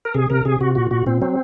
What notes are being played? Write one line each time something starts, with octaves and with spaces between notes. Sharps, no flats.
A#4
C3 G#4
C3 A#4
C3 G#4
C3 F#4
A#2 F#4
A#2 F#4
A#2 C4
F#3 C4